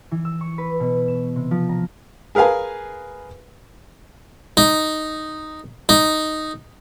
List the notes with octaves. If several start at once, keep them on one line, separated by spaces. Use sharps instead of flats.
E3
E6
C#6
B4
B2
E7
C3
F3
A#5
G#4 A#4 B4 F5 G#5
D#4
D#4